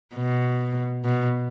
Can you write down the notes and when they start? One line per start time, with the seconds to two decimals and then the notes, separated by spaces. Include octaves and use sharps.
0.15 B2
1.05 B2